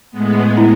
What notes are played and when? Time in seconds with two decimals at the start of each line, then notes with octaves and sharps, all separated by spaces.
0.11 A2 G#3 B3
0.57 E4